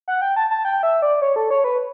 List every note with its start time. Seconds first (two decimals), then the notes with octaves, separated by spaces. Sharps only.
0.08 F#5
0.22 G5
0.36 A5
0.50 A5
0.65 G5
0.83 E5
1.02 D5
1.22 C#5
1.36 A4
1.50 C#5
1.64 B4